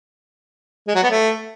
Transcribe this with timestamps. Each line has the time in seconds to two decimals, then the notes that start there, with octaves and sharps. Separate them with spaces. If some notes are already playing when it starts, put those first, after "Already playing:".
0.88 G#3
0.95 F#3
1.03 B3
1.10 A3